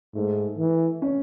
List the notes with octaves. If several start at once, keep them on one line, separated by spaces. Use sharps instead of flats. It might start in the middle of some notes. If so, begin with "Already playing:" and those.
G#2 A3
E3
C#4